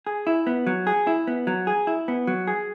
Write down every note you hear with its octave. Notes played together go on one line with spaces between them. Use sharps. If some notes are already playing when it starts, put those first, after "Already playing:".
G#4
E4
B3
F#3
G#4
E4
B3
F#3
G#4
E4
B3
F#3
G#4